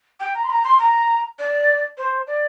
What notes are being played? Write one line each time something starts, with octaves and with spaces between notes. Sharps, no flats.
G5
A#5
C6
A#5
C6
A#5
D5
C5
D5